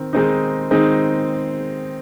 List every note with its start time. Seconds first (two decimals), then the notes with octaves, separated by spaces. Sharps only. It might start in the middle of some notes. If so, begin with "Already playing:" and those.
Already playing: D#3 C4
0.13 D#3 G#3 C4 D#4
0.71 D#3 G#3 C4 D#4